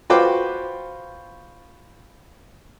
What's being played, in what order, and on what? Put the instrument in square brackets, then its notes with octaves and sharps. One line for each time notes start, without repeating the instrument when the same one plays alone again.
[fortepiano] F4 F#4 B4 C5 G5 D6